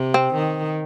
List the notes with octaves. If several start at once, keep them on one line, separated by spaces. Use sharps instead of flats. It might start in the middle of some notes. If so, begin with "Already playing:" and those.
Already playing: C3
C4
D#3